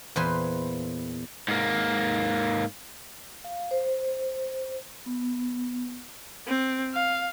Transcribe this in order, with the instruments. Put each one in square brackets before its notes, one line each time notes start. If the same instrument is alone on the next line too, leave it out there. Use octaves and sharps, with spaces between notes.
[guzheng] E2 A#2 B4 C5 G#5 C6
[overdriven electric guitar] G#2 A#3
[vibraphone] F5
C5
B3
[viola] C4
F5